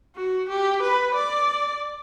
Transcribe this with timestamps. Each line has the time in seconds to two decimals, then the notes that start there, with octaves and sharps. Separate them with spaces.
0.15 F#4
0.49 G4
0.82 B4
1.15 D5